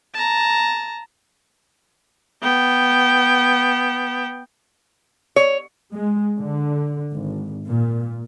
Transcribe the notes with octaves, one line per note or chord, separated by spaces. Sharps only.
A5 A#5
B3 G5
C#5
G#3
D3
G#1
A#2